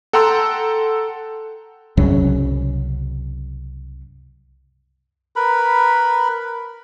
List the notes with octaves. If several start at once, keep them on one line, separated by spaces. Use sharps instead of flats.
A4 F#5 G5 A#5 C6 E6
C2 F#2 C#3 F#3
A#4 B4 B5